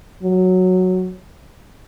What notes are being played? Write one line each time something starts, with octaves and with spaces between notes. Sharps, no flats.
F#3